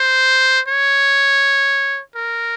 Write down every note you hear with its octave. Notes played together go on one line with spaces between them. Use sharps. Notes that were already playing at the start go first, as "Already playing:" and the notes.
Already playing: C5
C#5
A#4